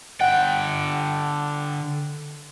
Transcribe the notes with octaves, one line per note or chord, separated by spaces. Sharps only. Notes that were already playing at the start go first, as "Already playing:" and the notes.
D3 F#5 G5